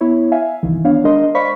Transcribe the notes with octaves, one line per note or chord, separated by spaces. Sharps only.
B3 E4 C#5
E5 F5 G#5
G1 C2 D#3 E3
B3 D4 C#5 F5
G#3 D4 A#4 D#5 C6
C5 D5 F5 B5 C#6 B6